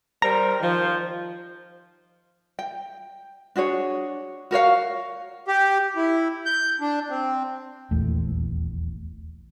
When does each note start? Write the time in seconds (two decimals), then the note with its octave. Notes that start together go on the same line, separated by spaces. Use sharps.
0.22 G3 A#4 C5 A#5
0.60 D#3 F3
2.59 G5
3.56 D4 F#4 G#4 C#5
4.51 F#4 A#4 C#5 F5
5.48 G4
5.96 E4
6.46 G6
6.81 D4
7.10 C4
7.91 D#1 A#1 E2 A3